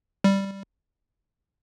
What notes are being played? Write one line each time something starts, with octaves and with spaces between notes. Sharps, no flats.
G3